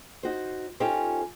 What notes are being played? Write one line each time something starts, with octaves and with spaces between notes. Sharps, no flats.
D#4 F#4 C5
C#4 D#4 F4 G4 A4 C5